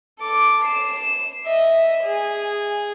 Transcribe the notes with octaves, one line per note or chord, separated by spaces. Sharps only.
A4 D6
C7 E7
D#5 E5
G#4